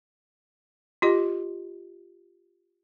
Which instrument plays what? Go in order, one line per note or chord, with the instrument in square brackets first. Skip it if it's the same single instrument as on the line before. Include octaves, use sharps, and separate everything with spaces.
[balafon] F4 G4 D#5